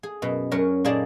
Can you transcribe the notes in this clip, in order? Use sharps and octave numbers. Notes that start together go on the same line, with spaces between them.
G#4
F#2 B2
F#2 F#3 C#4 A#4 A#5
A#2 A#3 D#4 G#4 D5 A5